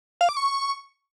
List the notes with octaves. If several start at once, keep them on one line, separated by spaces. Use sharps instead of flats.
F5
D6
C#6